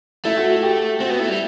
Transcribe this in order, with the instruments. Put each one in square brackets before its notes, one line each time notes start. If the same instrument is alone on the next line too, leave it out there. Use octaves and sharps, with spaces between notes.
[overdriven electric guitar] A3 [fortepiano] E4
[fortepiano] F#4
F#4
G4
[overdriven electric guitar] C4 [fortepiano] F#4
[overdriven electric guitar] B3
[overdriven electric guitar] A3 [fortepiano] E4
[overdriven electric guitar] G3